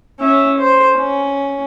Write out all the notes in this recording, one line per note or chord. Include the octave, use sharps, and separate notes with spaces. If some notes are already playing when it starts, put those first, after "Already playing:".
C#4 E5
C5
C#4